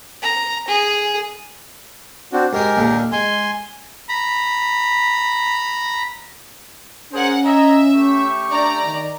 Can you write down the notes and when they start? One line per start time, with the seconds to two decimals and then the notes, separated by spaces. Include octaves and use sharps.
0.22 A#5
0.68 G#4
2.33 C4 D4 F#4
2.53 G#2 G#3 G4 G#4 A#4
2.77 D#2 A#2 D3
3.12 G#3 G#5 C6
4.09 A#5 B5
7.13 C#4 G#4 A#4 C5 F#5 G#5
7.45 D#5 E5 G#5 A#5
7.94 A3 G4 C#6
8.50 D4 D5 A#5
8.83 D#3